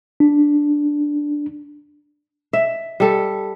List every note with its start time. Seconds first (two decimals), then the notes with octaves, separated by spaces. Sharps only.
0.20 D4
2.53 E5
3.00 G3 A4